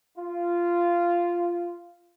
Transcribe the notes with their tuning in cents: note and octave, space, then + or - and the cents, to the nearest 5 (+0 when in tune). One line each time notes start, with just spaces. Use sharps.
F4 -10